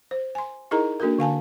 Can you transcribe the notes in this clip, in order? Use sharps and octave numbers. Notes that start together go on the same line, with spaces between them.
C5
G#5 C6
D#4 E4 G#4 A#4 D#5 A#5
A#3 D4 F#4 A4 A#4
D3 F5 G#5 A5